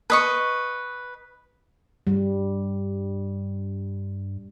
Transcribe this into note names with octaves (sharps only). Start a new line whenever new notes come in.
B4 D#5 C#6
G2 G3